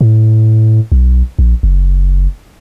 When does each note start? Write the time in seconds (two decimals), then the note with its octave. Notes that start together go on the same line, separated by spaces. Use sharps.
0.01 A2
0.92 B1
1.39 A#1
1.63 F#1